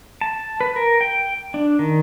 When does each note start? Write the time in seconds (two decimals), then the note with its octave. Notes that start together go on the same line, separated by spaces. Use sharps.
0.21 A5
0.61 B4
0.76 A#4
1.01 G5
1.54 D4
1.79 D#3